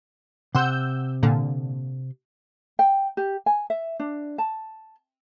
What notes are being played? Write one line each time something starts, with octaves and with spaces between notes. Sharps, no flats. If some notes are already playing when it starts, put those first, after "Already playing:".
C3 F#5 C6 E6 G6
A#2 D3
G5
G4
G#5
E5
D4
A5